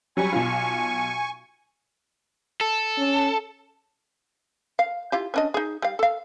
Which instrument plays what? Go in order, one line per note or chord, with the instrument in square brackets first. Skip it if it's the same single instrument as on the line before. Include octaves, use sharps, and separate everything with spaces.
[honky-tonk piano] F#3 G3 [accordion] G#5 C#6
[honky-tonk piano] B1 F4
[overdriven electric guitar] A4
[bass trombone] C#4
[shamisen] F5
E4 F4 G4
C#4 D4 D#5
D#4 G#4
G3 F5
A4 F5